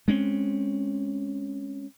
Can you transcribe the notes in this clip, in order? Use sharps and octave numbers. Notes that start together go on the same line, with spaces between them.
G#3 C4 C#4